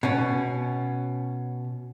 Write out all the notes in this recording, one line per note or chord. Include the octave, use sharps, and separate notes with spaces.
B2 C#4